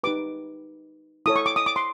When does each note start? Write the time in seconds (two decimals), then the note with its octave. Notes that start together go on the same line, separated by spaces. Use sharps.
0.04 D#4 G4 B4 D6
1.26 E4 A4 C#5 D#6
1.36 C#6
1.46 D6
1.56 D#6
1.66 D6
1.76 C6